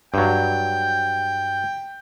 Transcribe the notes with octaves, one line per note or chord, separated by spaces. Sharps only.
G2 F#3 G5